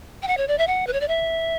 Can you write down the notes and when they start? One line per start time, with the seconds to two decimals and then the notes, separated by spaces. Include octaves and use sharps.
0.22 G5
0.28 F#5
0.37 C#5
0.48 D5
0.58 E5
0.67 F#5
0.87 B4
0.93 C#5
1.01 D5
1.08 E5